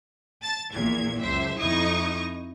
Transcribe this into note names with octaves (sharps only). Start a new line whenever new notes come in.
A5 A6
A#1 E2 A#2 G#6
C#2 F#2 C5 E5
F2 D#4 E4 C#6 D#6